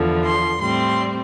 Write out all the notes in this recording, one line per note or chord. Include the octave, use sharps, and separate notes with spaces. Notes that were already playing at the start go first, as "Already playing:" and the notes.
Already playing: E2 D3 F3
C6
A2 G3 C4 C6